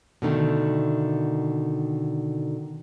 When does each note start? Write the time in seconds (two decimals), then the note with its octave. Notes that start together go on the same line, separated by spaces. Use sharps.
0.22 B2 D3 D#3 A3